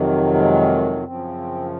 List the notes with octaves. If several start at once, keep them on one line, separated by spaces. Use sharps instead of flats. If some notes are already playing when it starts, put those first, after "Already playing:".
Already playing: F2 C3 D#3 F#3
G#3
F#2 C#3 F3 C4